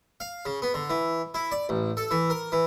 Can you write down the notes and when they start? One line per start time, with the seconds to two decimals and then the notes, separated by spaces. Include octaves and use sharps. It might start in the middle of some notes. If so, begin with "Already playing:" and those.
0.20 F5
0.46 C#3
0.62 B3
0.74 D3
0.90 E3
1.34 E4
1.52 D5
1.69 A1
1.97 A4
2.11 E3
2.30 A#4
2.52 E3